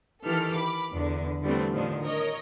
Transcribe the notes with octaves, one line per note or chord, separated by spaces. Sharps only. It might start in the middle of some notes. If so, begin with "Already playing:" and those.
D#3 E3 G4 A4 F6
B5 D6
E2 D3
D3 E3 G3 A3 B3 C4
A2 D3 D#3 F3
A#4 C#5 D#5